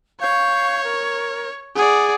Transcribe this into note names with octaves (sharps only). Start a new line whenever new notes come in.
C#5 F5 C#6 G6
A#4
G#4 D5 F#5